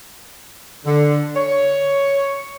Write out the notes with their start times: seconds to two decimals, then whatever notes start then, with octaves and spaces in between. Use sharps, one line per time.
0.86 D3
1.36 C#5